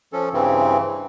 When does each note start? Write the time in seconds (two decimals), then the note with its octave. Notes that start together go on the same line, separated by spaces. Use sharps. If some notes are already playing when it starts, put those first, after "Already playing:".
0.13 F3 C#4 A4
0.33 G2 C#3 E3 C4